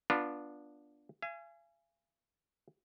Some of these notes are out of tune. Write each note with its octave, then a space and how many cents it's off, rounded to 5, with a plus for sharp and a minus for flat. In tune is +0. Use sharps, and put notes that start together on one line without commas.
B3 -15 D4 +0 F4 +0
F5 -45 G#5 +0